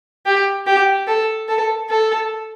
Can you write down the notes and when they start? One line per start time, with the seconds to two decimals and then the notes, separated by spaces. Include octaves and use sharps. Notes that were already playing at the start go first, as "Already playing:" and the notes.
0.26 G4
0.67 G4
1.07 A4
1.49 A4
1.90 A4